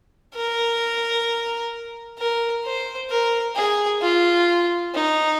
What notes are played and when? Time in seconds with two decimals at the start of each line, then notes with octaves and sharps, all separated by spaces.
0.35 A#4
2.18 A#4
2.64 C5
3.10 A#4
3.55 G#4
4.01 F4
4.94 D#4